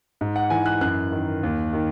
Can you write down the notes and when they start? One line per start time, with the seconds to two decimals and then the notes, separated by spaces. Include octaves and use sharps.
0.21 G#2
0.36 F#5
0.50 E3 G#5
0.66 F#6
0.81 F#2 F#6
1.12 D#3
1.43 D#2
1.73 D#3